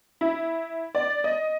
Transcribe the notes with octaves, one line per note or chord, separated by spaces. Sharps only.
E4
D5
D#5